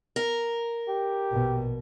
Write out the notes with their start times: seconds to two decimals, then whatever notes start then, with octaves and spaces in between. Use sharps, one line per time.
0.16 A#4
0.88 G4
1.31 A#1 B2